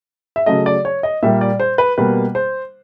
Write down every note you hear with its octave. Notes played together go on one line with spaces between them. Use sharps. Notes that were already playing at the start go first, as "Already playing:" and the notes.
E5
C#3 F#3 A3 D#5
D5
C#5
D#5
A#2 G3 A#3 E5
D5
C5
B4
B2 G3 A#3 B4
C5